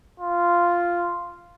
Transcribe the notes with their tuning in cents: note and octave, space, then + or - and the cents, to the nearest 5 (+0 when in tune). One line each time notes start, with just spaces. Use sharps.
F4 -5